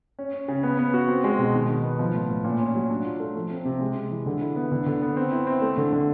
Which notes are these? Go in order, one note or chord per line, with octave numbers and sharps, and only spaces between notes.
C#4
C#4
C#3
B3
B3
F#4
C4
G#3
B2
D#3
D#3
B3
F3
A2
A2
A#2
C#4
F#3
D4
F4
A3
F3
C4
C3
G#3
C3
E3
D3
E4
B3
D3
D3
B3
C4
E4
C4
A3
D3
D3